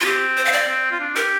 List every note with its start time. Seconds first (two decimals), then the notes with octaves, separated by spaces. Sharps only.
0.01 F4
0.05 C4 G4
0.37 C5
0.45 F5
0.52 D5
0.68 C4
0.91 F4
1.00 D4
1.16 G4 A#4